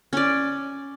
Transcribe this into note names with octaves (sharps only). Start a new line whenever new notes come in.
C#4 D5